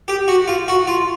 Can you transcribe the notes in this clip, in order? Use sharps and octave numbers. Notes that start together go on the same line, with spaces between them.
G4
F#4
F4
F#4
F4